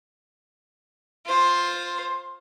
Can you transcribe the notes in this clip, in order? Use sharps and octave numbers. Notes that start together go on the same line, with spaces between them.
F4 C5